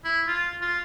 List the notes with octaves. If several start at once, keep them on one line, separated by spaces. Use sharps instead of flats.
E4
F4
F4